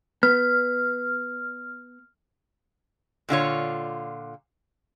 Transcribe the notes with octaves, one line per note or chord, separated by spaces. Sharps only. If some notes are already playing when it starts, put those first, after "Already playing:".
B3 F6
A#2 D3 F4 C#5